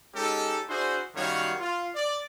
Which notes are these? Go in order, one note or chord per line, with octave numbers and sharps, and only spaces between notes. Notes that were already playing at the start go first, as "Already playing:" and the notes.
G#3 C#4 D#4 G4 A4
D4 E4 F#4 G#4 C5
F#2 D#3 G3 F#4 C#5 F5
F4
D5